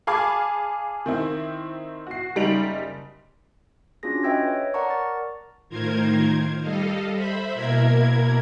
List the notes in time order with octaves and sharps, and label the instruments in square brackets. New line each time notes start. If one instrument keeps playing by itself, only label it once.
[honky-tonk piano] G#4 F5 A5 B5 D6 G#6
D#3 C4 E4
F#4 C7
F#1 G3 D#4 D7 F7 F#7
[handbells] C#4 D4 F4 F#4 G#4 A#6
B4 D#5 E5 G5 E6 G#6
C#5
A#4 D5 F#5 A5 A#5 C#6
A6
[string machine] A2 D#3 F4 A#4 C5 G#6
G3 A4 D#5 F5
C5 E5 B5
B2 A#3 E4 A#4 G#6